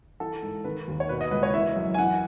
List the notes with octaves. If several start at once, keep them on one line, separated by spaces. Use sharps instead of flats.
E3 A4
G#2
D#3 B4
D#2
C#5
B2 B4
D#5
C#2 B4
C#5
E3 E5
F#2
G#5
E3 F#5